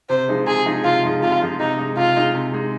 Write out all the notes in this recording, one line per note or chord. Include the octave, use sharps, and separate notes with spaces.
C3 C5
F3 G#3 D#4 G#4
C3 G#4
F3 G#3 D#4 G#4
C3 F4
F3 G#3 D#4 G#4
C3 F4
F3 G#3 D#4 G#4
C3 D#4
G#3 D#4
C3 F4
G#3 D#4
C3
G#3 D#4